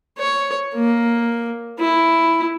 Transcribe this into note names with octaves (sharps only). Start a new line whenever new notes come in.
C#5
A#3
E4